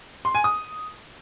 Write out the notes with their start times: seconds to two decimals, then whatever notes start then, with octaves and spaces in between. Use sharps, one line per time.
0.25 C6
0.35 G#5
0.44 D#6